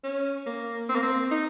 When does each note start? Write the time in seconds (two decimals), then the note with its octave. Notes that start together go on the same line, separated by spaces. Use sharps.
0.04 C#4
0.46 A#3
0.89 C4
0.95 A#3
1.03 C4
1.31 D#4